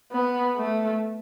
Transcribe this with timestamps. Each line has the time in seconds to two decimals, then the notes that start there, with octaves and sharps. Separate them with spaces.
0.12 B3
0.56 A3